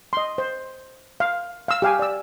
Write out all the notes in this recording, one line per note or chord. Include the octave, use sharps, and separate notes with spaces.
D#5 C6
C5
F5
F5 E6
G4 F5 G#5
D5 E6